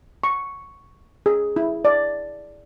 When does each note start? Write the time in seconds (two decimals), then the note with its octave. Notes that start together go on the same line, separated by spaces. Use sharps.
0.24 C#6
1.26 G#4
1.56 E4
1.85 D5